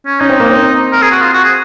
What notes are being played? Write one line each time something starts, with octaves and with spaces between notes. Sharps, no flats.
C#4
C#4 D#4
C4
A#3
C4
A#4
G#4
F#4
F4
F#4
G#4